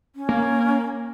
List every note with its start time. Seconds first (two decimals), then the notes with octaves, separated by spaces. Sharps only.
0.16 C#4
0.29 A#3